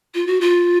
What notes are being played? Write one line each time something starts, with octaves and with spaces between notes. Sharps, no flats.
F4
F#4
F4